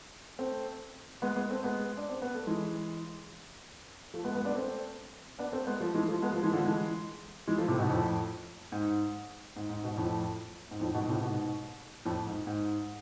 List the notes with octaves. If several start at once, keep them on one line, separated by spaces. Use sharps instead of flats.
A3 C4
G#3 B3
G#3 B3
A3 C4
G#3 B3
D4
C4
B3
A3
E3 G#3
F3 A3
G#3 B3
G#3 B3
B3 D4
A3 C4
B3 D4
A3 C4
G#3 B3
F3 A3
E3 G#3
F3 A3
G#3 B3
F3 A3
E3 G#3
D3 F3
E3 G#3
E3 G#3
F3 A3
A2 C3
G#2 B2
F2 A2
G#2
G#2
G#2
G#2 B2
F2 A2
G#2
F2 A2
G#2 B2
A2 C3
G#2 B2
F2 A2
G#2
G#2